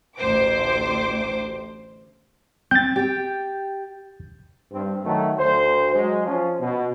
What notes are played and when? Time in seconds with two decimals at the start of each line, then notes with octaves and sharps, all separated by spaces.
0.17 A1 D2 C5 D6
2.71 C4 G6 A6
2.96 G4 G5
4.72 G2 C4
5.04 D#3 F#3 A3
5.39 D2 C5
5.94 F#3 G#3
6.25 F3 C#4 F4
6.60 B2